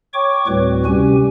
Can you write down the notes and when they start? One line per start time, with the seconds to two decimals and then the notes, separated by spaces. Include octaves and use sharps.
0.14 C#5 G5 C#6 D6
0.47 D2 A2 G3 C4 F#4 B4
0.85 C3 G3 C#4 G4 G#5